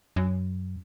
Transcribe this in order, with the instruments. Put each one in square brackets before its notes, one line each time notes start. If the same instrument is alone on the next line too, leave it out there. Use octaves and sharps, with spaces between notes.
[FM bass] F#2